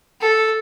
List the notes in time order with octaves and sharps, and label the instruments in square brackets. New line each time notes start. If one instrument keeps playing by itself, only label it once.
[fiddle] A4